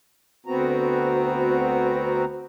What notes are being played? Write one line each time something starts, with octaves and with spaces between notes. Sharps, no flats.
D2 B3 C4 F#4 A#5